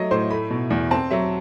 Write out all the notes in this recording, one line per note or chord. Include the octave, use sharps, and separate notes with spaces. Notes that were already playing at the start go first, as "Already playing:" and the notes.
Already playing: F#3 A3 D#5
A2 C5
A3 B5
B2
E2
C4 A5
F#3 E5